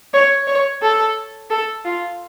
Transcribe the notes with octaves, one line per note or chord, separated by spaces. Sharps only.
C#5
C#5
A4
A4
F4